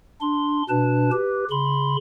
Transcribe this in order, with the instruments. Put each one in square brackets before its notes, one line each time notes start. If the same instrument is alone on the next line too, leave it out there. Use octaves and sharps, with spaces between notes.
[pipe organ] D4 C6
B2 D4 B4 A5
G4 B4
C#3 B5 C6